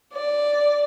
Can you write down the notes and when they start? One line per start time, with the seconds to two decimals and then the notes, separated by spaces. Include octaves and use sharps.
0.13 D5